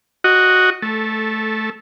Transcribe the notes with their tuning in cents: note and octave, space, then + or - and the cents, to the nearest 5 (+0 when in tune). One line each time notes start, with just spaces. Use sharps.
F#4 +0 D#5 +0
A3 -15 A4 +0